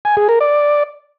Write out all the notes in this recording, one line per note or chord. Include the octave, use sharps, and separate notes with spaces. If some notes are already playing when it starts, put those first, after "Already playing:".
G#5
G#4
A#4
D5